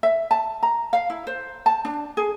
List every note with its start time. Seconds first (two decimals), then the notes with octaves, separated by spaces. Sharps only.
0.03 E5
0.31 A5
0.63 A#5
0.93 F5
1.10 E4
1.27 C5
1.66 A5
1.85 D4
2.17 G#4